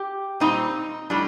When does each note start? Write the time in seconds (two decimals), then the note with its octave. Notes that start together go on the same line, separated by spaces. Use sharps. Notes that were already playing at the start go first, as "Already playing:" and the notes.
Already playing: G4
0.40 A#2 G3 C4 D#4
1.10 A2 G3 D4